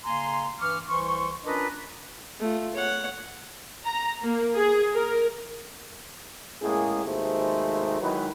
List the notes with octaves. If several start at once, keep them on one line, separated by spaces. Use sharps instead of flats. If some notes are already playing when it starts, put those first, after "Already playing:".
C#3 A#3 G#5 A#5 C6
G2 E3 C#6 D6 F6
C2 E3 C5 C6 C#6
C#4 D4 F4 A#4 B4 D#5
A3 F4
C#5 F#5
A#5
A#3
G#4
A#4
A2 G#3 A#3 C#4 G#4
G#1 D#2 C3 G#3 A3 C5
D#3 F#3 G#3 E4 B4